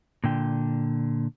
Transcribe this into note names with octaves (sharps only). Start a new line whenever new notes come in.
A#2 D3 G5